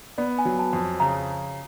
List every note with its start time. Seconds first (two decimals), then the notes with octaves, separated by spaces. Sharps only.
0.18 B3 D5
0.38 G#5
0.45 F#3
0.59 A5
0.73 F2
1.00 C#3 A#5